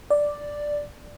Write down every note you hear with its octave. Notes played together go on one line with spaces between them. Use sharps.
D5